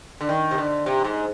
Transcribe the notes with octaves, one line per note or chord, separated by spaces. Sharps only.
D3
D#3
C3
D3
C3
G#2